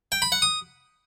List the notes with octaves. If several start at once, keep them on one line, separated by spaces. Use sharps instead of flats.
G5
B5
F#5
D#6